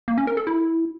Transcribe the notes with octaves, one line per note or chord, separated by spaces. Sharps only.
A#3
C#4
A#4
A4
E4